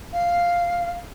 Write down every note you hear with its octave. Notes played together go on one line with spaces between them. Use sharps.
F5